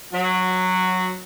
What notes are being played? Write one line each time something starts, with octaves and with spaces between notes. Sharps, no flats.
F#3